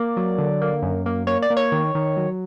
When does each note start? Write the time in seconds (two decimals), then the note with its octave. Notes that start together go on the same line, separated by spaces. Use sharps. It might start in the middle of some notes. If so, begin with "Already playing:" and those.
Already playing: A#3 D5
0.17 F#3
0.38 D3
0.61 A#3
0.83 F#2
1.06 A#3
1.27 A#3 C#5
1.42 D5
1.50 A#3
1.57 C#5
1.72 D#3
1.95 D#3
2.17 F#3